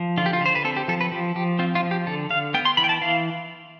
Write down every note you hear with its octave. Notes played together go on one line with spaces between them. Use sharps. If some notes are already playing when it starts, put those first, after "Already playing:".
Already playing: F3
D3 F4
G4
F4
D3 C5
B4
C4 A4
G4
F3 A4
B4
F3 G4
F3 G4
C4 F4
F4
F3
G4
D3 A4
D3 F5
B3 G5
C6
E3 B5
G5
A5
E3 F5